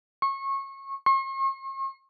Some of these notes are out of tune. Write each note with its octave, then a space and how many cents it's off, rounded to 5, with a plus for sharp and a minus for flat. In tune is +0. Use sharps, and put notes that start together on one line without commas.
C#6 -25
C#6 -45